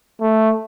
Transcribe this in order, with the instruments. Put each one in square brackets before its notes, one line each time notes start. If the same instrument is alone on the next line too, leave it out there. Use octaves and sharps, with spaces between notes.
[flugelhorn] A3